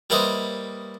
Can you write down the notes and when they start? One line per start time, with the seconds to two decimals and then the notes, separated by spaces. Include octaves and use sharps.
0.10 G3 A#3 E4 B4 C5 D#5